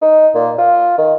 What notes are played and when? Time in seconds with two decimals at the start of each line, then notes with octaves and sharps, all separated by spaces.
0.02 D#4
0.35 A#2
0.58 F4
0.98 D#3